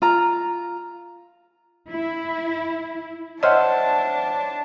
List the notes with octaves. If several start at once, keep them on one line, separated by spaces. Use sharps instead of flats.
F4 A#5
E4
D4 C5 C#5 D#5 E5 F#5 A5 F6